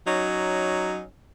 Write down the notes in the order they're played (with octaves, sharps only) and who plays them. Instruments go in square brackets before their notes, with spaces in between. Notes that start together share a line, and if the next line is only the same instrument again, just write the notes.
[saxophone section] F#3 C#4 D#4